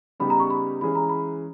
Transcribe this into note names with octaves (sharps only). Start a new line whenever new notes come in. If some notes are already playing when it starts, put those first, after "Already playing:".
C#3 G3 B3 D#4 G4 B5
A#5
C#6
B5
E3 G#3 C#4 G#4 B5
A#5
B5